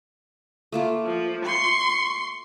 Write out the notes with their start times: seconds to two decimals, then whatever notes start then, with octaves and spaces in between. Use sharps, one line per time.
0.72 A3 A#3 F4
1.07 F3
1.46 C6 C#6